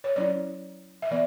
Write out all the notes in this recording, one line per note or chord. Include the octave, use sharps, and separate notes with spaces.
C#5
F#3 C#4 E4 D5
E5
E3 B3 D5